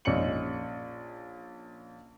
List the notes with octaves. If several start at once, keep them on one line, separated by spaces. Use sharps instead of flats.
A#1 C#4 D#4 C#7 F#7